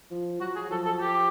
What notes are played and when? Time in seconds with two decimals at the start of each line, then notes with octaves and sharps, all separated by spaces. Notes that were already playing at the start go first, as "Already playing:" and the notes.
0.11 F3
0.41 F#3 F#4
0.56 G#4
0.71 F3 A4
0.86 A4
1.01 G4